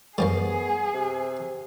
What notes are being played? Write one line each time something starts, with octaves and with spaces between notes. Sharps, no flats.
F#2 F3 G3 B3 G#4
C3